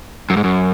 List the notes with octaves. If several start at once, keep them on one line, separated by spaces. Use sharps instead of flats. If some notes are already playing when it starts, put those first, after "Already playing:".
F#2
G#2
F#2